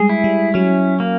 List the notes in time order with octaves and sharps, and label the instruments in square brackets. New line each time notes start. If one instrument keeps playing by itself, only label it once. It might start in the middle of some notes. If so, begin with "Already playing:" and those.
Already playing: [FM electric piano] G3 G#3 [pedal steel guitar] G#4
[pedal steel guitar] E4
[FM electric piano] G3
[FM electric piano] F#3 [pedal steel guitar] C#4
[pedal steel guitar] A#3